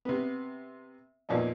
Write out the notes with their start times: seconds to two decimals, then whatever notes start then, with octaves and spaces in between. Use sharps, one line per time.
0.05 C3 B3
1.29 E2 A#2 F3 C#4 D#4